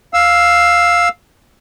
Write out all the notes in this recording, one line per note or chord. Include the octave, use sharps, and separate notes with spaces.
F5 E6